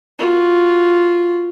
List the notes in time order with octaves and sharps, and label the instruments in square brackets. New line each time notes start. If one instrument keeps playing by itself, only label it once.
[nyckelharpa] F4 F#4